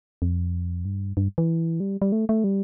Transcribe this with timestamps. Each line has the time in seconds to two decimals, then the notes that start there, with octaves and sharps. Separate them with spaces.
0.22 F2
0.85 G2
1.17 G2
1.38 E3
1.80 G3
2.02 G3
2.12 A3
2.29 A3
2.44 G3